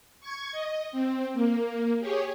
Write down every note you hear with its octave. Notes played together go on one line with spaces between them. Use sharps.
C#6 G#6
D#5
C4
A#3
G4 G#4 C#5